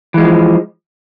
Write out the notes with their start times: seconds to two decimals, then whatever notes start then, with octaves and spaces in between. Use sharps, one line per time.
0.14 E3
0.18 G#3
0.21 F3